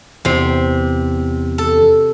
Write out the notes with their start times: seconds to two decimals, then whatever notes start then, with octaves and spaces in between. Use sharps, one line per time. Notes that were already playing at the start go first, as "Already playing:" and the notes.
0.25 E2 C3 C5
1.58 A4